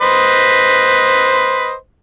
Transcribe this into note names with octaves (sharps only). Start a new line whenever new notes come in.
B4 C5 D#5